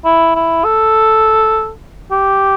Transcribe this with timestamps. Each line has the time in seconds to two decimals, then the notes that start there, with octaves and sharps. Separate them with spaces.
0.05 E4
0.35 E4
0.64 A4
2.11 G4